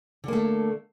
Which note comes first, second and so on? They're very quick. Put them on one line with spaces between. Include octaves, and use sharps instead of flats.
D3 A#3 A3